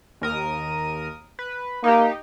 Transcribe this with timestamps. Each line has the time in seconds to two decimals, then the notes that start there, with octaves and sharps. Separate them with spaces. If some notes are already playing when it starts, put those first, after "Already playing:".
0.21 D#2 A#4 D#6
1.39 B4
1.84 A#3 D#4 G4